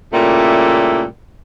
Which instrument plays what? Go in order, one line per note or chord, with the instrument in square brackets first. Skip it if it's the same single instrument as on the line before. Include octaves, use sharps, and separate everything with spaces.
[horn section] A#2 C#3 G3 A3 E4